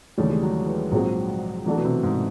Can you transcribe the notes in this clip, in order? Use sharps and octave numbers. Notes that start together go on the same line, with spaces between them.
D#2 C#3 E3 G3 A3
G#3
F#3
E3
A#1 G#2 F3 F#3 G#3 C4
E3 F#3 A3 D4 F#4 A4
B2
C3
G#2